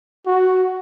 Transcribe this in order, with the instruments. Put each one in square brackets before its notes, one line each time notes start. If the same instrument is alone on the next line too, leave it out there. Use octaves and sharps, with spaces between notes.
[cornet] F#4